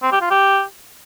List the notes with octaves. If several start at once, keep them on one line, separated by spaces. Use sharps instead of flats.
C4
G4
F4
G4